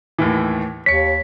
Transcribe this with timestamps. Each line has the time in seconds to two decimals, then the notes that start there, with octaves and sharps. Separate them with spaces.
0.19 D#2 A2 E3
0.86 D#2 C#5 B6 C#7